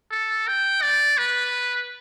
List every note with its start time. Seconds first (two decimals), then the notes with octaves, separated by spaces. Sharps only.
0.11 A4
0.48 G5
0.82 D5
1.18 B4